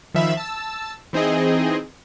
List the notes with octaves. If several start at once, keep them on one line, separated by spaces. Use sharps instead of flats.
D#3 F3 E5 F5 B5 E7
A5 E6
E3 C4 D#4 G#4 D#5